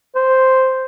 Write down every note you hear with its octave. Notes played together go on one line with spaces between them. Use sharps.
C5